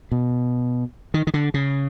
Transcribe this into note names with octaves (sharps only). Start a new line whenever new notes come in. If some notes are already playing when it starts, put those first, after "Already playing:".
B2
D#3
D#3
D3
C#3